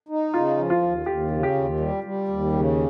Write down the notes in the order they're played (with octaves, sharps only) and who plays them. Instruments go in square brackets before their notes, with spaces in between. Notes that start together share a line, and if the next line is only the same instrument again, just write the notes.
[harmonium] D#4
[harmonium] C#3 [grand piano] F4
[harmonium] F3
[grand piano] F4
[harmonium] D#2
[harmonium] D#2 [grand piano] G4
[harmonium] C#3
[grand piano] G4
[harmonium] D#2
G3
G3
D#2
C#3